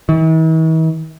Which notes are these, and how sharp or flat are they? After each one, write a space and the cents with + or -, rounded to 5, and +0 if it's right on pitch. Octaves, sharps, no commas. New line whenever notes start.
E3 -45